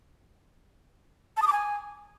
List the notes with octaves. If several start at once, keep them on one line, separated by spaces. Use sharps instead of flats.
A5
D#6
D6
G#5